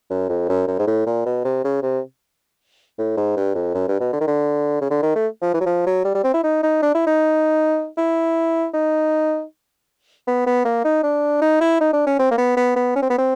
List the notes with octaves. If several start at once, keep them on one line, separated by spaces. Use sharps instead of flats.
F#2
F2
F#2
F#2
G#2
A2
A#2
B2
C3
C#3
C3
A2
G#2
G2
F2
F#2
G2
B2
D3
D#3
D3
C#3
D3
D#3
A3
F3
E3
F#3
F3
F#3
G3
G3
C4
E4
D#4
D#4
D4
E4
D#4
E4
D#4
B3
B3
A#3
D#4
D4
D#4
E4
D#4
D4
C#4
C4
A#3
B3
B3
B3
C#4
C4
B3
C4